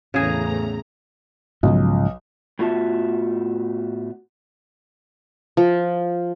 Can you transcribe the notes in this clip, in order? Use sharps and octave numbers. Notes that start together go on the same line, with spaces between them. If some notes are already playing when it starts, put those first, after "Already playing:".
E2 A2 C#3 G#4 A#5
B1 G#2 C#3 F3
A2 B3 F4 F#4 E5 A5
F3